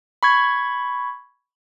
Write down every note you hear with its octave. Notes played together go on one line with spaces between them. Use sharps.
B5 C#6 G#6